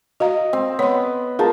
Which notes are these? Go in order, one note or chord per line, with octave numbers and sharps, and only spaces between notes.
F#4 D#5 F5 A#5
C4
B3 C#5 C6
F4 G#4 A#4 A5